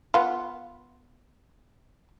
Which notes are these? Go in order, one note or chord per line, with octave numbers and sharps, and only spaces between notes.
B3 F4